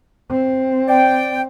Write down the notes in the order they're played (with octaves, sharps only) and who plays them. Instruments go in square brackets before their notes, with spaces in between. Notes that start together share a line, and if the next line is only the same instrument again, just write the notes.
[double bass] C4
[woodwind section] D5 G5